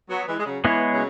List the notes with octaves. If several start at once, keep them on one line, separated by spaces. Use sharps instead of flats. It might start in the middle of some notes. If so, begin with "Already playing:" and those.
F#3 B3
E3 G#3
G#3
C#3 F#3
E3 G#3 B3 E4 G#4 C#5
C#3 F#3